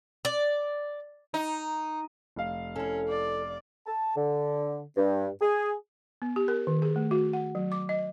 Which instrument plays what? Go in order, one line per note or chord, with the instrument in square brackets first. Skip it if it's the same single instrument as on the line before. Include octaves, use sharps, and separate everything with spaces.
[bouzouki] D5
[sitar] D#4
[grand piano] F1 F5
[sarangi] C#4 [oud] E4 A4
[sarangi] D5
[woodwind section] A5
D3
G2
G#4
[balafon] B3
G4
A#4
D#3
G#4
A3
F#4
F#5
F#3
D6
D#5